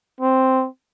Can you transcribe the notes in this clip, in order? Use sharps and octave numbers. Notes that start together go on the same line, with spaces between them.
C4